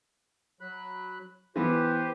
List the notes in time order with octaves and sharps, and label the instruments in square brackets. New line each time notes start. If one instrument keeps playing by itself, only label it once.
[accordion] F#3 B5 F#6
[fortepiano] E3 B3 [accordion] G4 B4 C5